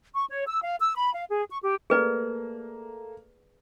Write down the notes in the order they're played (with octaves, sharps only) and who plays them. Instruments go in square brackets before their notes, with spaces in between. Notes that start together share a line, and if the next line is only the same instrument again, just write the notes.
[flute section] C#6
C#5
E6
F5
E6
B5
F5
G#4
C#6
G4
[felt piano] A3 A#3 [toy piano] G#4 B4 D5